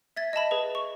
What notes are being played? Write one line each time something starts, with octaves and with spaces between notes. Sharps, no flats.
E5 G#6 A6
D#5 E5 A5 B5
G#4 B4
C#6